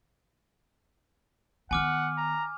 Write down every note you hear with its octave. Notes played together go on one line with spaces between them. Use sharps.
D#3 B3 F#5 G#5 D6 F6
A#5